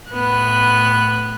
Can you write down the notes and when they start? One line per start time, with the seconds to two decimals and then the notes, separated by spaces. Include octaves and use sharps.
0.12 A2 B3 F#6